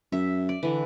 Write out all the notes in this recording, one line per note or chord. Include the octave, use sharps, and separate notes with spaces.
F#2 E5
D5
D3 E3